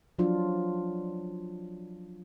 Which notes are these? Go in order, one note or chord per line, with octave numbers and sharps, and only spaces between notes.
F3 F#3 D4 F4